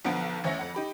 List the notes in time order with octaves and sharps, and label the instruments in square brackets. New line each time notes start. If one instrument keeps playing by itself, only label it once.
[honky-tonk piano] B1 D3 F3 B3 D7
A1 E2 C#4 C#5 E5 A#6
F2 F#5
D#4 G4 B5